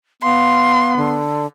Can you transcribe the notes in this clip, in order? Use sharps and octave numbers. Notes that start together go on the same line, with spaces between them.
B3 F5 C6
D3